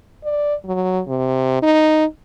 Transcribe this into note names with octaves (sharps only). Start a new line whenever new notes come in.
D5
F#3
C3
D#4